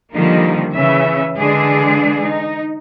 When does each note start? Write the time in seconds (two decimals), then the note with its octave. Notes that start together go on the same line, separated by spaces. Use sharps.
0.15 D3 D#3 F3 G3 A#3 D#4
0.71 C#3 E3 C#4 E5
1.37 D3 E3 G#3 D4 G#4 D5
2.22 D#4